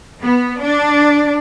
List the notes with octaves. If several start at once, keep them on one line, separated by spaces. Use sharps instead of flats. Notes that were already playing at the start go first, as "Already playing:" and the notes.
B3
D4